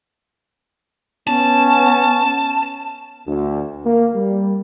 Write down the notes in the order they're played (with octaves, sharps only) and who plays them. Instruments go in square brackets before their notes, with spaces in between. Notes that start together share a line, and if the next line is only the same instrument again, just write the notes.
[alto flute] B3 [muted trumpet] C#4 [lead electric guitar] A5
[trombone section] D2
A#3
G3